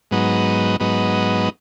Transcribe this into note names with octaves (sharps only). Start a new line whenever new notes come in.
G#2 F#3 B3 D#4
G#2 F#3 B3 D#4